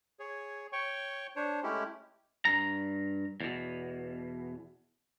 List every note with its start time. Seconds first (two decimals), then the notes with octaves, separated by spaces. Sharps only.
0.19 G#4 C#5
0.73 C#5 G5 C#6
1.36 D4 C5 C#5
1.63 G#3 A3 C#4 E4 G4
2.45 G2 A#5
3.41 E2 B2